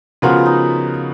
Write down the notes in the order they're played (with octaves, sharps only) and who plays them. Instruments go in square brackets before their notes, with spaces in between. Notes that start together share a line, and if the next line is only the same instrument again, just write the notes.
[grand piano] C#3 F3 B3 F#4 A#4 [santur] F4
[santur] D#4